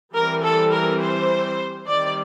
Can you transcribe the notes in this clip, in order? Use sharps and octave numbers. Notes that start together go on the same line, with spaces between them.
E3 G3 C4 A#4
A4
A#4
C5
D#3 G3 C4 D5